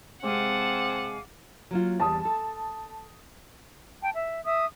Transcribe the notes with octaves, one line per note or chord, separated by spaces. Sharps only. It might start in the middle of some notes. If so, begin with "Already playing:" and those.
C3 G#3 C4 F5 F#5 G#5 A5 D6
F#3 A#3 F4
E2 G3 A5 D#6
A4
G5 A5
E5
E5 D#6